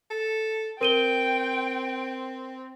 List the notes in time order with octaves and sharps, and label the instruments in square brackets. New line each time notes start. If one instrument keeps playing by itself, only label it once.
[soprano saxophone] A4
[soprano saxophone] C4 [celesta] A#4 D#7 G7 [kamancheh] G5